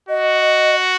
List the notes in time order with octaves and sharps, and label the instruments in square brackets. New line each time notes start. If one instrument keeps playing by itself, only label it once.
[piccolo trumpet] F#4 [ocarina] D#5